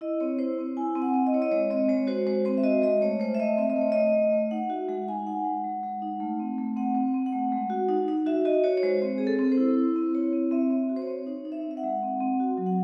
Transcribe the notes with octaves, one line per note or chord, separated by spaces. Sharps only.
E4 D#5
C4 C#5
E4 C5
C4
E4 G#5
C4
F#5
C4
D#5
E4 C#5
D#5
G#3 C#5
C4 D#5
G#3 C#5
F#4 C5
G#3 C5
C4 C5
E5
F#4 D#5
G#3 D#5
A3 C#5
A3 C5
E5
A3 D#5
C4 E5
D#5
A3
C#5
A3 D#5
A3
A3
D#4 F#5
F#4 E5
G#3 F#5
D#4 G#5
D#4 F#5
G#3
G#3
G#3
D#4
A3
C4
A3
C4 F#5
C4
C4
F#5
A3
G#3
F#4
D#4
D#4
F#4 E5
F#4 D#5
F#4 C#5
C#5
G#3 C5
C4 C5
C4 G#4
A4
C4
C5
E4
E4
C4
E4 C#5
C4
C4 E5
C4
F#4
C5
C#5
C4
D#4 C#5
D#4
E5
C4
E5
F#5
G#3
C4
C4
F#4
F#3
F#5